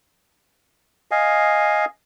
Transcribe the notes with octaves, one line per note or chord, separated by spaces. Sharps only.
D#5 F5 G#5